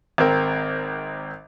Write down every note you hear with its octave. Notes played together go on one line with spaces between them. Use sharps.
G#1 C4 A#4